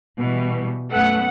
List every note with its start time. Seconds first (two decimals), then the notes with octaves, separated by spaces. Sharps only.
0.19 B2 E3 G3
0.91 F#2 A3 B3 F#5